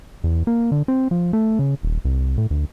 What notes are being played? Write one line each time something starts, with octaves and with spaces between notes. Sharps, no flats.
E2
A#3
D3
C4
F3
A3
C#3
D#1
C2
A2
D2